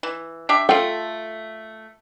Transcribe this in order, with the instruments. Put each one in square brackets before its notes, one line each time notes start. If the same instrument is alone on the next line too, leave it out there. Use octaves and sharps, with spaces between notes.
[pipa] E3
D4 G4 E5
[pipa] A3 F4 [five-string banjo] A4 G5